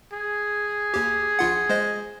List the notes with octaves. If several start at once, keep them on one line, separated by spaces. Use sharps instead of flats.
G#4
D#2 G4
A#1 F4 F#5
G#3 C5 D#5